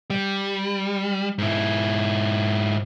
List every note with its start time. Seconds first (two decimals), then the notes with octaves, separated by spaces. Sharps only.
0.10 G3
1.38 G#2 E4